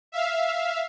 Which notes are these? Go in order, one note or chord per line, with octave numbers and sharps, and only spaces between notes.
E5 F5